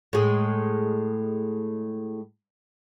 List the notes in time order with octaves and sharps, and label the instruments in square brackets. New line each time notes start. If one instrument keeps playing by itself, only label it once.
[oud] A2 G#3